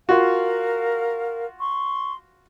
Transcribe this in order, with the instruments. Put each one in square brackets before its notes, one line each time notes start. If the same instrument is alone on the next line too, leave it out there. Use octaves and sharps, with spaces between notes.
[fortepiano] F4 F#4 [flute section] A#4 F5
[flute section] C6 C#6